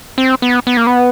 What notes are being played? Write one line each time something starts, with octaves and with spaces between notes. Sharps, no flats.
C4
B3
B3
A#3
B3